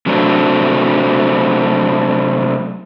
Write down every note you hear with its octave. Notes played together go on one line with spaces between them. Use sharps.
C3 F#3 A3 C4 D4